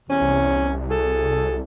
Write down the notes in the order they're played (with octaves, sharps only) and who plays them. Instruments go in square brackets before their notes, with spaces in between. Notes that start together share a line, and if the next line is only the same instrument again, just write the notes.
[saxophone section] E2 C3 C#4
[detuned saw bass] C2
[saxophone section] F#4 G#4 A4